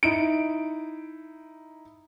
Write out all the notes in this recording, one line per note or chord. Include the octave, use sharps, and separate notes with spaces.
D#4 E4 D7